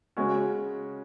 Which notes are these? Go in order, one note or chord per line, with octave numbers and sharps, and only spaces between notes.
C#3 G#3 C#4 F#4